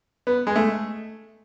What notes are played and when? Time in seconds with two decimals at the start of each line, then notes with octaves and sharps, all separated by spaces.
0.27 B3
0.47 G#3
0.56 A3